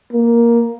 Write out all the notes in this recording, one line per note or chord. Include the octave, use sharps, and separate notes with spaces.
A#3